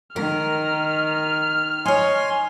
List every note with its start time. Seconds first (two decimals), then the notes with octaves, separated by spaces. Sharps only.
0.16 D#3 A#4 F6
1.86 D#4 C#5 G#5 C6